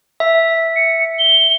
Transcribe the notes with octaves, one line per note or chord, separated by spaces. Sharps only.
E5
C#7
G7